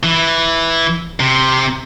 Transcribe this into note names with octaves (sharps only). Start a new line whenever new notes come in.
E3
C3